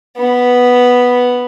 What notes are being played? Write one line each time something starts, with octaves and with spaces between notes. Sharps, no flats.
B3